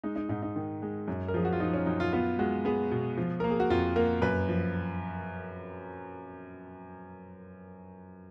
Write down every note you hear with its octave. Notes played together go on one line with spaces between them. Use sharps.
G#3 D#4
D#4
G#2 D#4
D#4
D#3
G#3
F#2
A#4
F3 G#4
F#4
F4
F3 D#4
C#4
F#2 D#4
F4
B3 F4
G#3 F#4
B3 G#4
B2
F3
A#3 A#4
G#4
F#4
F2 F4
A#3 A#4
F#2 B4
F3